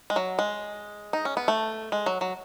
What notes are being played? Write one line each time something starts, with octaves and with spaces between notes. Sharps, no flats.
G#3
F#3
G#3
D#4
C#4
B3
A3
G#3
F#3
F#3